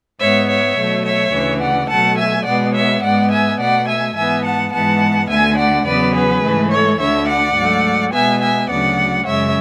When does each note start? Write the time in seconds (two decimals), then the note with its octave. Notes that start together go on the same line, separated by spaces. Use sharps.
0.19 G#2 G#3 B3 C#5 E5
0.49 C#5 E5
0.77 B2 F#3 A3
1.05 C#5 E5
1.33 D2 C#3 E3
1.62 D5 F#5
1.89 B2 F#3 A3 F#5 A5
2.18 E5 G#5
2.46 B2 G#3 B3 D5 F#5
2.75 C#5 E5
3.03 G#2 G#3 B3 D5 F#5
3.31 E5 G#5
3.60 B2 A3 D5 F#5
3.88 E5 G#5
4.16 G#2 E3 B3 E5 G#5
4.45 F#5 A5
4.73 G#2 E3 G#3 B3 F#5 A5
5.29 D2 D3 A3 E5 G#5
5.58 D5 F#5
5.86 E2 C#3 F#3 B3 B4 D5
6.14 G#4 B4
6.44 G#2 E3 A3
6.72 A4 C#5
6.99 D2 D3 A3 C#5 E5
7.28 D5 F#5
7.56 G#2 F#3 A3
8.13 B2 G#3 B3 E5 G#5
8.42 E5 G#5
8.69 D2 C#3 F#3 D5 F#5
9.26 F#2 C#3 G#3 C#5 E5